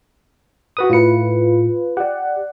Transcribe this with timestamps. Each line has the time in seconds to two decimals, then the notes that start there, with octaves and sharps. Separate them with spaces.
0.77 F#4 B4 D#6
0.90 A2 F4 B4 C#7
1.97 G4 D5 F#5